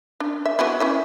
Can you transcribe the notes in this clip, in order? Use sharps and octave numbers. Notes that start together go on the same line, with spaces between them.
D4
E5
F#3 B3 E4
C#4 E4 E5